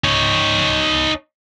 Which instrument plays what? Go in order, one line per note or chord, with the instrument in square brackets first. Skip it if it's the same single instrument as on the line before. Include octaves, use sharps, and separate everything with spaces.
[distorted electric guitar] D#4 C#5